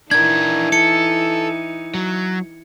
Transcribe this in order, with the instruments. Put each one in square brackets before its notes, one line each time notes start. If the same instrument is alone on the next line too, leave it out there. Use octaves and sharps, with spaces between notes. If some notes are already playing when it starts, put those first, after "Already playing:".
[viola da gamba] E3 D#4 [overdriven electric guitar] D4 A#4 [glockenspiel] G#6
[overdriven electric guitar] A4 [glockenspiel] C#7
[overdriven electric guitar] F#3